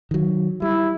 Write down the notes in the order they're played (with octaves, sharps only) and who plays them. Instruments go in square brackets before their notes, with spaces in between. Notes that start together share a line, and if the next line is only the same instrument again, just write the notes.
[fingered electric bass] D#3 F#3
[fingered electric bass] G3 [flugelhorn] E4